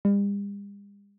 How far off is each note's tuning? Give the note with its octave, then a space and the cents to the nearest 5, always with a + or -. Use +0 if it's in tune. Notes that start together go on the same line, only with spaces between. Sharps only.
G3 +45